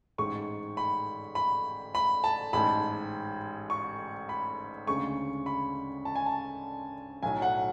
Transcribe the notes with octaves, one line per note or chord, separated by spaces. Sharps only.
A1 G#2 G#3 C#6
B5
B5
B5
A5
A1 G#2 G#3 B5
C#6
B5
D2 C#3 G#3 C#6
B5
A5
G#5
A5
B1 A2 F#3 G#5
F#5